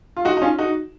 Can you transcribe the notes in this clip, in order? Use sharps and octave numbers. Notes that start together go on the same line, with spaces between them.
F4
D#4 F#4
D#4
C#4 F4
D#4 F#4